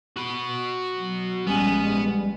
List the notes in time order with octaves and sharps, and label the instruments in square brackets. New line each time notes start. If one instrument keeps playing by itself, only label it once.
[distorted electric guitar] F#4 B5
[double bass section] F#3
[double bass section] A#1 G#3 [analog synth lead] G3 [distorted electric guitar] B3 [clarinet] C#4